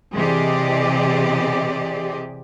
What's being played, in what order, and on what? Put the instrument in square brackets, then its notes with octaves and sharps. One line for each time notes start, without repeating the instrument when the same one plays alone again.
[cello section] C3 E3 G4 G#4 D5 D#5